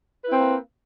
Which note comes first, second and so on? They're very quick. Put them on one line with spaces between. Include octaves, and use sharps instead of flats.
B4 E4 C4 A#3